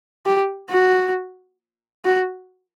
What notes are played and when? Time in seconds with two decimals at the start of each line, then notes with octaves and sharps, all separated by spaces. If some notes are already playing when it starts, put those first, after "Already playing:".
0.26 G4
0.70 F#4
2.05 F#4